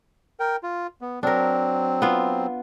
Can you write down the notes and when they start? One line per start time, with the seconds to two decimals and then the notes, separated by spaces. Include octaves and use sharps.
0.40 A#4 G5
0.63 F4
1.01 B3
1.23 F#3 C4 D4 A#4
2.02 B3 F4